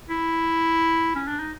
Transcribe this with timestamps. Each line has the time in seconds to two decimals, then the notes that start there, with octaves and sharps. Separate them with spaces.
0.10 E4
1.16 C#4
1.28 D4
1.40 D#4